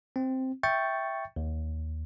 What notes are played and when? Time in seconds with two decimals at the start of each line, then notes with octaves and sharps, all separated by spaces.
0.16 C4
0.63 E5 G5 C#6 G6 A6 C#7
1.36 D#2